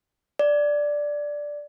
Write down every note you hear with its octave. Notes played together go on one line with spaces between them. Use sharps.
D5